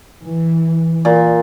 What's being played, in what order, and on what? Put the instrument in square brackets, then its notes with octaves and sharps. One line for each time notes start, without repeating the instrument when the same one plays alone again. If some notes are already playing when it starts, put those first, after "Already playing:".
[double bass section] E3
[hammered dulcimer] A#2